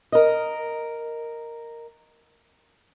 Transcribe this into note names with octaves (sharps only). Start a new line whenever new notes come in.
A#4 D#5